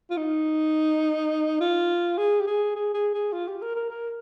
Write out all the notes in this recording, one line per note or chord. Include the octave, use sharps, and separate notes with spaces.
F4
D#4
F4
G#4
G4
G#4
G#4
G#4
G#4
F4
G4
A#4
A#4
A#4